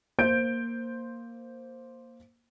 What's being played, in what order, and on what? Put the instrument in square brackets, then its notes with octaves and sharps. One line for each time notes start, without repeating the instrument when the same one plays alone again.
[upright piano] A#3 C5 G6 D7